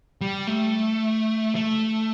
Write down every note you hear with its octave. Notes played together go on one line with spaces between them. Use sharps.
G3
A3
A3